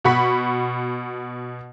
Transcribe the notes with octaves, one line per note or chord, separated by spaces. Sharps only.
B2 F#5 B5 C#6 B6